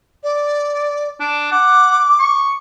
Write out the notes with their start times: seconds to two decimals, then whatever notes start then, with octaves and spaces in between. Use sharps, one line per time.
0.23 D5
1.20 D4
1.52 F#5 D6
2.20 C#6